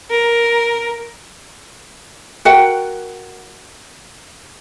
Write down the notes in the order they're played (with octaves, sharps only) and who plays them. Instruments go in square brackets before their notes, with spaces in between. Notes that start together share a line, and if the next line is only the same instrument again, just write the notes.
[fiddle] A#4
[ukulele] F#4 A#4 F#5 G5